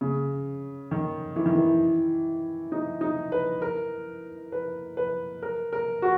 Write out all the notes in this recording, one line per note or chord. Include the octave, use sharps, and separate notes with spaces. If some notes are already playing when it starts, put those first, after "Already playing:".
C#3
D#3
E3
D#3
E3
D#4
D#4
B4
A#4
B4
B4
A#4
A#4
F#4